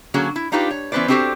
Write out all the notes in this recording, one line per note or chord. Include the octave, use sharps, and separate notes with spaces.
D3 F#3 A#3 C#4 F#4 G#4
E4
D4 D#4 F4 G4 B4
C#5
E3 B3 C#4 B4 C5 D5
C4 D4 F#4 G4 A4 C5